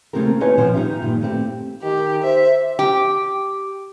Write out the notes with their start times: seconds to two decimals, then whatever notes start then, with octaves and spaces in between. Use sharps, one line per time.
0.13 D#2 C#3 A3 C4 G4 A#4
0.41 D#4 F4 B4 C#5 D#5 G#5
0.58 B2 D#3 F3 C#4 C5
0.74 D#4 F4 G4 E5
1.02 G2 A#2 D#3 F3 G3
1.21 A3 C4 E4 G4
1.83 D#3 G4
2.23 C5 E5
2.79 G4